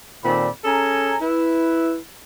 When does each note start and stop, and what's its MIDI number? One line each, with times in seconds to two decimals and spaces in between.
0.24 0.49 46
0.24 0.49 51
0.24 0.49 60
0.24 0.49 69
0.24 0.49 74
0.24 0.49 83
0.65 1.16 61
0.65 1.16 68
0.65 1.16 69
0.65 1.16 80
0.65 1.16 82
1.21 1.97 64
1.21 1.97 71